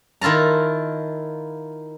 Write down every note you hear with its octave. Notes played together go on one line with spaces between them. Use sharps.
D#3 E4 F4 A5 A#5